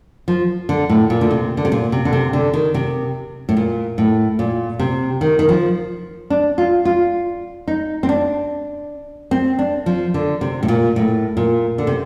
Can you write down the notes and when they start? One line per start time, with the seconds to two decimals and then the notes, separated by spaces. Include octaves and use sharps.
0.28 F3
0.69 D3
0.89 A2
1.10 A#2
1.21 D3
1.31 C3
1.57 D3
1.65 C3
1.72 A#2
1.92 C3
2.05 D3
2.13 C3
2.33 D3
2.53 D#3
2.74 C3
3.49 A2
3.57 A#2
3.98 A2
4.39 A#2
4.79 C3
5.21 D#3
5.39 D#3
5.49 F3
6.30 D4
6.58 F4
6.85 F4
7.68 D#4
8.03 C4
8.09 D4
9.31 C4
9.59 D4
9.86 F3
10.14 D3
10.41 C3
10.63 A2
10.68 A#2
10.96 A2
11.37 A#2
11.78 D3
11.87 C3